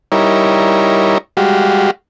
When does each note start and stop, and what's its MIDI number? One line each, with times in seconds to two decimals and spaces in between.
0.12 1.18 55
0.12 1.18 63
0.12 1.18 64
0.12 1.18 70
0.12 1.18 73
1.37 1.91 55
1.37 1.91 56
1.37 1.91 66
1.37 1.91 67
1.37 1.91 77